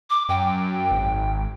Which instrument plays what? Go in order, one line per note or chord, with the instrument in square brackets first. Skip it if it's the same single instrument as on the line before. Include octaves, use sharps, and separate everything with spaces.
[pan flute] D6
[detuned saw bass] F#2 [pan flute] G5
[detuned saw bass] G#1